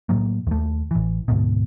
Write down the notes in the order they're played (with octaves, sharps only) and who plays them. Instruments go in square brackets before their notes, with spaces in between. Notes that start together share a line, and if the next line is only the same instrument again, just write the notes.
[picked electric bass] A2 F#3 A#3
D#2 A3
A1 E3
D2 G#2 B2